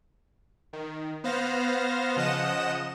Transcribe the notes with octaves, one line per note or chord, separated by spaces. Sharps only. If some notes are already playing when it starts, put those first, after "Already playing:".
D#3
B3 C5 F5 A#6
C#3 F3 D#5 F#5 D#6 E7